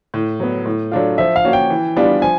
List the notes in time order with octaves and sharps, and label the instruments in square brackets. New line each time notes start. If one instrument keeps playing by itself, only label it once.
[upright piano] A2
F#3 B3
A2
F#3 A3 D4 F4
[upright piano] F3 [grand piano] E5
[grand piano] F5
[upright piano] A#3 C#4 F#4
[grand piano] G5
[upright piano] E3
G3 B3 D4 F4
[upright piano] F3 [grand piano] G#5